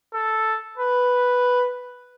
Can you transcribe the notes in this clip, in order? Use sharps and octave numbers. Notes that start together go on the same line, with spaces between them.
A4
B4